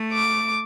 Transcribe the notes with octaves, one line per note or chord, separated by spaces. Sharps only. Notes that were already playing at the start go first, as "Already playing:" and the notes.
Already playing: A3
D6